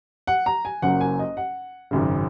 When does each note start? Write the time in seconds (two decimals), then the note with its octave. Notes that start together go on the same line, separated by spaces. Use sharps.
0.27 F#5
0.46 A#5
0.65 G#5
0.82 F#1 F#2 F#3 A#3 F#5
1.01 G#5
1.19 D#5
1.37 F#5
1.91 G#1 F#2 C#3